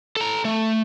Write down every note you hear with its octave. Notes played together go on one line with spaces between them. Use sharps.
A4 A#5
A3